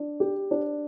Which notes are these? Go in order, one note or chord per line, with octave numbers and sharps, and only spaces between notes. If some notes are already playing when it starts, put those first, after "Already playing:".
Already playing: D4
G4
D4